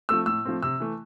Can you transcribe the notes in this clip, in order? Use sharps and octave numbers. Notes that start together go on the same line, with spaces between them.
F3 A3 C4 E6
A2 E6
F3 A3 C4
C3 E6
E3 A3